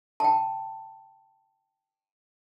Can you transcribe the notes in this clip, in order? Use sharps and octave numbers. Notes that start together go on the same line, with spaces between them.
G5 A5